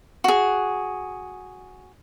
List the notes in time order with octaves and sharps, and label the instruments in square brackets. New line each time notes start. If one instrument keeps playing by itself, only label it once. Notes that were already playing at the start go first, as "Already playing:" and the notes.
[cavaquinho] F#4 G#4